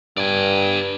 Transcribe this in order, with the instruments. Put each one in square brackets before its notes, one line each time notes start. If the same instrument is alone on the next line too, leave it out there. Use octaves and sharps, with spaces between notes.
[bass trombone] G2 [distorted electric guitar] D5 G#5